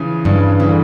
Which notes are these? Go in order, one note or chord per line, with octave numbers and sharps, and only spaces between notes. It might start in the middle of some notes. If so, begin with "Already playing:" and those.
Already playing: C#3 E3 F3
G2 C#3
C#3 E3
D3